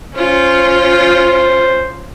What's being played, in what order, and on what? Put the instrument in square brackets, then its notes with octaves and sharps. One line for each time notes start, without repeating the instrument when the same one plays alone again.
[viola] C#4 F4 [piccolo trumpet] C5